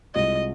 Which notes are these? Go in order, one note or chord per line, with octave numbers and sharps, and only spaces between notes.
C2 C3 G#3 F4 G#4 D#5